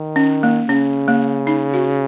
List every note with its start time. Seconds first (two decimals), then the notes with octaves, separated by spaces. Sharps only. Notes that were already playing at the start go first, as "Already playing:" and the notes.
Already playing: D#3
0.16 C#4
0.43 A#3
0.69 C#3 C#4
1.08 A#3
1.47 D#4
1.74 F#4